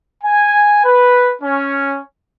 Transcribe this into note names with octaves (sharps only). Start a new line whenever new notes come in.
G#5
B4
C#4